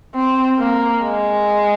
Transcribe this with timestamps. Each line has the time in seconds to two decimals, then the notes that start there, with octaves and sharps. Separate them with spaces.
0.15 C4
0.59 A#3
1.03 G#3